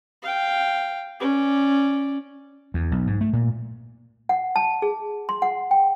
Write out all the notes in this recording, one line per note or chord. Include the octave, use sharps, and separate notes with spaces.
F5 G5
C#4 D5
E2
B1
G#2
A3
A#2
F#5
A5
G#4
C6
F#5
G5